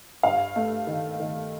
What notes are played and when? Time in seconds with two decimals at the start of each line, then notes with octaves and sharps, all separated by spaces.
0.23 G2 F5
0.56 A3
0.87 D#3
1.20 D#3